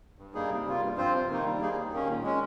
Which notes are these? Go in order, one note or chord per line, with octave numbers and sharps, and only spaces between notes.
G2
G3 A#3 D#4 G#4
C3
G3 A#3 F4
G2
F3 C4 F4 C5
C3
D#3 A#3 D#4
G3
A#3 D#4 G#4
D#2
D#3 A#3 C#4
A#2
G#3 C#4